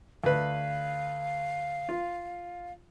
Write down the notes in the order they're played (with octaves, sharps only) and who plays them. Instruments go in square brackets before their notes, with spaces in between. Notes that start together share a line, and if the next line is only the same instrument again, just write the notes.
[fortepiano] D2 B4 [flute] F5
[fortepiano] F4